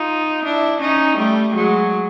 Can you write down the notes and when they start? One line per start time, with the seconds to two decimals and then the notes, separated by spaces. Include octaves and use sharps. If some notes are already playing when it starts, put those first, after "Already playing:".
Already playing: D#4 F4
0.44 D4 E4
0.81 C#4 D#4
1.17 G3 A3
1.54 F#3 G#3